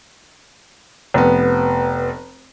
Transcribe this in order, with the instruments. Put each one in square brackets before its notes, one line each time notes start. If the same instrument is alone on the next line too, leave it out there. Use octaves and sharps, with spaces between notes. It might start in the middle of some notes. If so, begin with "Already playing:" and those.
[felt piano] F1 B3